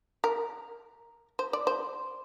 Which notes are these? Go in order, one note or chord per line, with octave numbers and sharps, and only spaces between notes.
A#4
C5
D5
C5